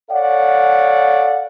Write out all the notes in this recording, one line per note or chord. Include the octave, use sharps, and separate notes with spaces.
A4 C#5 D5 F5 F#5